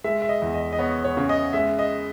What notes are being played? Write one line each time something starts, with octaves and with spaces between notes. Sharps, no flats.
G#3 E5
E5
D#5
E2
D#5
D#5
B3 C#5
C#5
C#3
D#5
G#3 E5
D#5